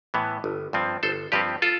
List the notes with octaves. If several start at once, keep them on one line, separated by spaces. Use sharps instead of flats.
A2 E3 B3
G1
G2 F3 C4
G1 A4 C5
G2 F3 C4 G4 B4
F4 A4